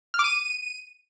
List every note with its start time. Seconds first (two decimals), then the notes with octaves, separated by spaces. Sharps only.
0.14 F6
0.19 D6
0.24 D#7